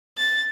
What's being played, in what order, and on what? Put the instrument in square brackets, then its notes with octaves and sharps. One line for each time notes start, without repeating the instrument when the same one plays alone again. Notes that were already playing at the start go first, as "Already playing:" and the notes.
[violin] A6